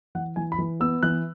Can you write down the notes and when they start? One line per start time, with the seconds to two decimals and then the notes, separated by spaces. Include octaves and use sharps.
0.15 E3 F#5
0.36 E3 G#5
0.52 B5
0.58 E3
0.80 B3 E6
1.03 E3 F#6